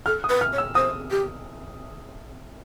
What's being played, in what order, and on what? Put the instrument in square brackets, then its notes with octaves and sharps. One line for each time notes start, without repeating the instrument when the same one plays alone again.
[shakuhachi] A4 [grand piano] F6
[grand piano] D#6
[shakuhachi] B4
[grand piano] F6
[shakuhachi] C#5
[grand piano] E6
[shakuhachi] C5 [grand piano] D#6
[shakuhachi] G4